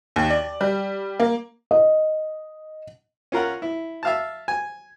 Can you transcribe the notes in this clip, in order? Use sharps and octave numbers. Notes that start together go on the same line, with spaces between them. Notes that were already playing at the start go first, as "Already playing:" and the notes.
D#2
D5
G3
A#3
D#5
C#4 F4 A#4 F#5
E4
E5 F5 A5
G#5